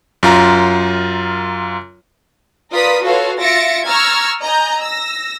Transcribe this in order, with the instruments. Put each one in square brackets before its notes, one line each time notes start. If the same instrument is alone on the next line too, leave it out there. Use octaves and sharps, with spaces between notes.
[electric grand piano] F#2 F4 A#5
[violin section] F4 A#4 B4 D5 D#6 B6
F4 F#4 A4 B4 C#5 F5
F4 E5 A6 A#6 C#7 D7
A#5 C#6 E6 F6 G#6 A6
D#5 G#5 A#5 G6
E6 A#6